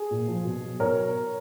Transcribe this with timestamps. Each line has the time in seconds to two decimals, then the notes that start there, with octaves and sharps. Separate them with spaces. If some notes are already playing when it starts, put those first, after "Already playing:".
Already playing: G#4
0.11 A#2
0.28 F3
0.45 B2
0.63 F#3
0.80 B2 A#4 C#5